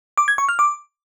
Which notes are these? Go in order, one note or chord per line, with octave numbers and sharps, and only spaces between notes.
D6
G#6
C#6
F6
D6